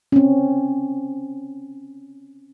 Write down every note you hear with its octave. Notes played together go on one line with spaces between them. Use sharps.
C4 C#4